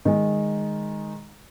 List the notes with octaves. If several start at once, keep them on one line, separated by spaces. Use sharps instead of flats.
D#3 G#3